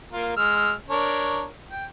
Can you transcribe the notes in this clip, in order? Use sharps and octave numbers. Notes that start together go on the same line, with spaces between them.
A#3 F4 A#4
G#3 E6 F6
D4 A#4 C#5
G5